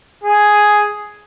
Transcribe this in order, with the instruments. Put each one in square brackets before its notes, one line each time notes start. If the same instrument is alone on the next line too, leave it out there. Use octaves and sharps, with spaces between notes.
[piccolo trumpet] G#4